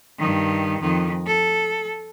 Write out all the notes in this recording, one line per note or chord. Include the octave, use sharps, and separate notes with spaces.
G2 D#3
F2 D#3
A4